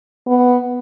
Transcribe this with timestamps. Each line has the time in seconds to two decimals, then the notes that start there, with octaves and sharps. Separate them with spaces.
0.27 B3